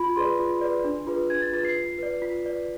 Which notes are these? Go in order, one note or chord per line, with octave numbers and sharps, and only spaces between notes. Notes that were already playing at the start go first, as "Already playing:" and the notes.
Already playing: F4 B5
G#4 B4 D5 C6
F4
G#4 B4 D5
D4
F4 G#4 B4
D4 G#6
A6
F4 G#4 B4 A6
C7
F4
B4 D5
F4 B6
B4 D5